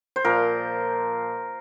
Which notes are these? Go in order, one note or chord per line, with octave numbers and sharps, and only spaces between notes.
C5
A#2 F3 A#4